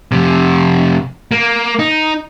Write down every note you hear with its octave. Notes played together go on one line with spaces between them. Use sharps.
F2 C3
A#3
D#4